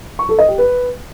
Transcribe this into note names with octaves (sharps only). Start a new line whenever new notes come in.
C#6
A4
D#5
G4
B4